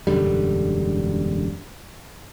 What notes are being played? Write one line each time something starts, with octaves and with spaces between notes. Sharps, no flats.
E1 F#2 D3 G3